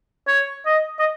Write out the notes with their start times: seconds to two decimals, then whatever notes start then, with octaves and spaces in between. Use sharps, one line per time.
0.28 C#5
0.66 D#5
0.99 D#5